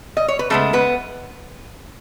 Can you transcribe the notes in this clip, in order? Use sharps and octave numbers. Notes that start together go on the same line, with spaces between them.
D#5
C#5
B4
C#3 G#3 A3 B3 A4
B3 B4